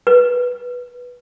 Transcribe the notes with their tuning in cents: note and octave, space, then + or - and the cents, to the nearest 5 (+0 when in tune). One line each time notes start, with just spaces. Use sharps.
B4 -10